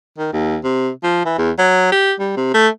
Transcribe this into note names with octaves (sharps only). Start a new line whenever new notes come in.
D#3
D#2
C3
F3
E3
E2
F#3
G4
G3
C3
A3